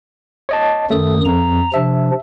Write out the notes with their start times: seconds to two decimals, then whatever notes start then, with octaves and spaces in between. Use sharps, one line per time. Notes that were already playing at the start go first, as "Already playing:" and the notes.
0.49 C#5 D#5 A5
0.90 F#2 D#3 A3 D#6
1.25 F2 A#5
1.74 C3 F3 D4 E5